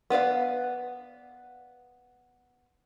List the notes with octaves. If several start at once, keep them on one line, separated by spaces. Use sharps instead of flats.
B3 B4 D5 F5